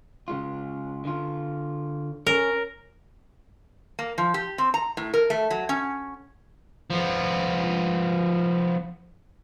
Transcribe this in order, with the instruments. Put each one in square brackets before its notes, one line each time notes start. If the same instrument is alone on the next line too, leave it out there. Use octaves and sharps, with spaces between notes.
[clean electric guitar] C#3 G#3 F4
D3 F4
[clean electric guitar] C#4 [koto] A#4
[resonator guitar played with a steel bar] A#3
F3
G4
C4
A#5
A2
A#4
A3
F#3
C#4
[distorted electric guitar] F3 B3